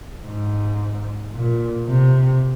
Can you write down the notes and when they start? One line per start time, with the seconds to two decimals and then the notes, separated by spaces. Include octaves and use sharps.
0.24 G#2
1.33 A#2
1.87 C3